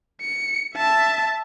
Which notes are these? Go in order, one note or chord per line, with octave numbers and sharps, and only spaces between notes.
C#7
E5 A5